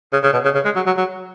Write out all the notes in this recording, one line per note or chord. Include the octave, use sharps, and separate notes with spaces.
C#3
C#3
B2
C#3
C#3
G#3
F#3
F#3
F#3